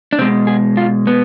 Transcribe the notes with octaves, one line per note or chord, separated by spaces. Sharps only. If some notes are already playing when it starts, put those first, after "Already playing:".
D4
B2 G#3 C4
G#4
F4
B3